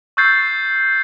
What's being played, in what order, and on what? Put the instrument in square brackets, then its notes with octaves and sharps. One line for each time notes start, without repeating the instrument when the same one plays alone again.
[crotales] C#6 E6 F#6 G6 A6 C7